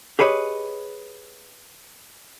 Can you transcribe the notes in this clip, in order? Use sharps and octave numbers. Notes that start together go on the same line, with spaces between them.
G4 G#4 B4 C#5 D#5